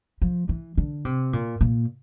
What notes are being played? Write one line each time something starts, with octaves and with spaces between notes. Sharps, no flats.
F3
E3
D3
C3
A#2
A#2